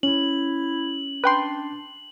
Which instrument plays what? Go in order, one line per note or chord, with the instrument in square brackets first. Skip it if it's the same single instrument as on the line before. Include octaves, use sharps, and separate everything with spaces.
[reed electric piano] C#4 [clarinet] E4 [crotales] F#7
[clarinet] D4 [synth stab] B4 G5 C6